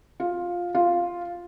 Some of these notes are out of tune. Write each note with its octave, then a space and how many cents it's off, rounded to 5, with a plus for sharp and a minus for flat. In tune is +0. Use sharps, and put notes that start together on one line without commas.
F4 +10
F4 +0